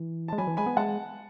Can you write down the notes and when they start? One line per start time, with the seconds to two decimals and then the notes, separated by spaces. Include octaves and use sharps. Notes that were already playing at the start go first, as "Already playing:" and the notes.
Already playing: E3
0.28 G#3 A5
0.38 F#3 G#5 B5
0.47 E3
0.57 G#3 G#5 B5
0.66 B3
0.77 G#3 F#5 A5